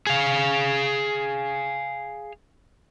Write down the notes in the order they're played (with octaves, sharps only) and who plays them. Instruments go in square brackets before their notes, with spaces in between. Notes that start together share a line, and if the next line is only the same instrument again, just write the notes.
[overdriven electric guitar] G#4 F5